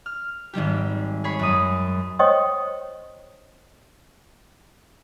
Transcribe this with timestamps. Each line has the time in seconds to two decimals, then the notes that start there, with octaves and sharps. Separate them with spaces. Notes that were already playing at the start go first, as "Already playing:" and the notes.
0.06 F6
0.53 G#1 D#3 G3 G4
1.24 G#4 C#5 B5
1.39 F#2 D#6
2.19 C5 C#5 D#5 G5 C#6 D#6